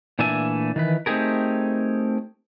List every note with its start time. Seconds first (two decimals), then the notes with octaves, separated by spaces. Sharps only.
0.19 A#2 E3 A3 D4 E5 G#5
0.76 D#3 E3 B4
1.06 A3 C4 D#4 G4 G#4 A#4